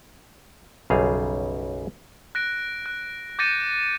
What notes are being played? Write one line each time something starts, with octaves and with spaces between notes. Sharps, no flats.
B1 F#2 C#3 G3 G#4 F5
F#6 A#6 D7
F#6
D6 G6 A6 A#6 C#7 D#7